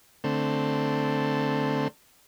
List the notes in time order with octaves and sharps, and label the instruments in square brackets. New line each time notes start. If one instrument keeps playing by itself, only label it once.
[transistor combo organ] D3 A3 C4